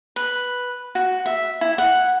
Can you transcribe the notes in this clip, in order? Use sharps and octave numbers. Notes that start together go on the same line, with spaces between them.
B4
F#4
E5
E4
F#5